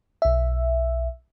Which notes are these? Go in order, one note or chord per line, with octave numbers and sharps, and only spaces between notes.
B1 E5